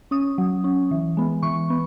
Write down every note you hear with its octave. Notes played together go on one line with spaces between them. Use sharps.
C#4 D#6
F#3
C#4
E3
G#3 B3
E3 C#6
B3